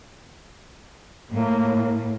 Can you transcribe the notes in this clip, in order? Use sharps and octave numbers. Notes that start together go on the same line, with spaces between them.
A2 A#3